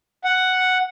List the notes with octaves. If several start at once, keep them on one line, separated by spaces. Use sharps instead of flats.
F#5